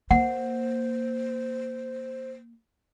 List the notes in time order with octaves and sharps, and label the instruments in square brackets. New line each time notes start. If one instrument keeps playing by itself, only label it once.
[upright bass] A#3 [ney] C5 [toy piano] F#5